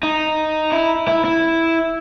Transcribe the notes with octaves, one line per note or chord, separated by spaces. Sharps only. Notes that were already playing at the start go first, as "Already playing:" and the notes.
D#4
E4
E4
E4